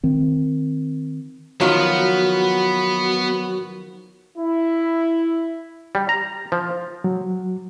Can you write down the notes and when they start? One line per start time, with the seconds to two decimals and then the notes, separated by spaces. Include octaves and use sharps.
0.04 D#3 C4
1.60 D#3 F3 F#3 B3 F4 F#4
4.38 E4
5.95 G3
6.09 A#5
6.52 F3
7.04 F#3